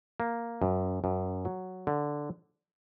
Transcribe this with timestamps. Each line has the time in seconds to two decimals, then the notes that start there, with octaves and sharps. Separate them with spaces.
0.20 A#3
0.62 F#2
1.04 F#2
1.45 F#3
1.87 D3